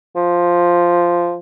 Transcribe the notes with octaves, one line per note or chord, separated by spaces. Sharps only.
F3